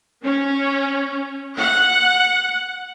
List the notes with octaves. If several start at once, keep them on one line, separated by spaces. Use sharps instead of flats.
C#4
F#5